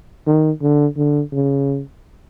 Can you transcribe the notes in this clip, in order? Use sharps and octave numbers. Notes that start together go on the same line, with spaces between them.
D#3
D3
D3
C#3